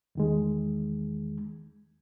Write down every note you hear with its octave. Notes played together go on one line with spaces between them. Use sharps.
E2 D#3 G#3